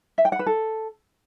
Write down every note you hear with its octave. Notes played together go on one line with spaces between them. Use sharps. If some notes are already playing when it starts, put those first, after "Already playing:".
E5
G5
F#5
B4
A4